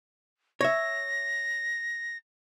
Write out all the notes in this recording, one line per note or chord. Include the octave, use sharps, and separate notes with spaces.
C#5 E5 A#6